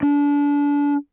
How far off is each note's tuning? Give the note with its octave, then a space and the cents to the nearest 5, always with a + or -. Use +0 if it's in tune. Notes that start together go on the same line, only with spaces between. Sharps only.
D4 -30